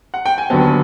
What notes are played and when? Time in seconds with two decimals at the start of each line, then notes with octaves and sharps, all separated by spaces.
0.14 F#5
0.26 G5
0.38 G#5
0.50 D#2 D3 F#3 B3 A5